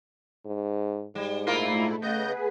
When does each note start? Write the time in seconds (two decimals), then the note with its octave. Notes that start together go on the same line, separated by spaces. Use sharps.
0.45 G#2
1.15 G#2 G3
1.47 A#2 A3 A#3 E4 F4 A#4
2.02 C#3 B3 G#4 B4 D#5 G6